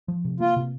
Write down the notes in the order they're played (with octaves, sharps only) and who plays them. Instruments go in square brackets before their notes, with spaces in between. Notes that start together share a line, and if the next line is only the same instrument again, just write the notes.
[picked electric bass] F3
C3
[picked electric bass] A#3 [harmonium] F4
[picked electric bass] C3